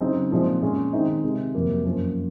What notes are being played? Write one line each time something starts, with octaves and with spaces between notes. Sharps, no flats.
C#3 F#3 C4 D#4
A#2 F3 G#3 C4 D#4
A#2 G#3 C#4
D#3 G#3 C4 D#4
C3 D#3 G#3
F2 C3 F#3 A#3
F#2 F3 A#3 C#4